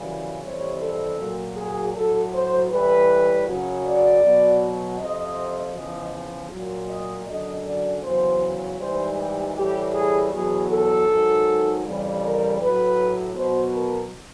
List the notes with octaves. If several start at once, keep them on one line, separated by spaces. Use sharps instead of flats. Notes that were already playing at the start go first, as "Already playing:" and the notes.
Already playing: F#2 C#3 E3 G3
F2 C3 E3 G3 C#5
A4
A#2 F#3
G#4
A2 F#3 A4
C5
A2 E3 G3 B4
F#2 C#3 F#3
D5
B2 F#3
F2 C3 F3 D#5
E2 C#3 F3 D#5
A#2 F#3
D#5
F#2 D3 F#3 D#5
D5
E2 C#3 F#3 C5
G#2 E3 G3 C5
G4
A2 E3 G3 G4
G#4
E2 B2 F#3 G#4
A4
G#2 D#3 F#3
F2 C#3 E3 G3
A#4
A2 F#3 B4
B2 F#3 C5
A#4